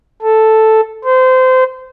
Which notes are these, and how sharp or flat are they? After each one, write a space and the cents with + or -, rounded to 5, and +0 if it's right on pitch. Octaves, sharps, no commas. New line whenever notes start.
A4 +0
C5 -25